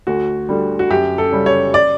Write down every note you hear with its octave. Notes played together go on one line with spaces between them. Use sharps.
D2 F#4
D3 G3
F#4
F#2 G4
A4
C#3 G3 C#4
C#5
D5